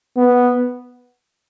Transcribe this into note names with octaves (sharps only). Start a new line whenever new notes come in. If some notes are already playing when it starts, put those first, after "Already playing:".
B3